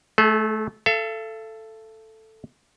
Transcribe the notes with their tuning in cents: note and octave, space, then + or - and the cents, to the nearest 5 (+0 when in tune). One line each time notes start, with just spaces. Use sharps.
A3 -20 G#4 +35
A4 +0 F5 -45